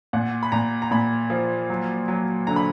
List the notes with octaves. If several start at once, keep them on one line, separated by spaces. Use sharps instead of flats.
A#2 F#5
B5
A#2 A#5
A#5
A#2 B5
F3
F#3
F#3
D3 A#5
B5